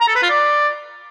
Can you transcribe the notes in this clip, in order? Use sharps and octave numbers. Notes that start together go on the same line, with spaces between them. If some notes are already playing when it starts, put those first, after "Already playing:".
A#5
A4
B4
F4
D5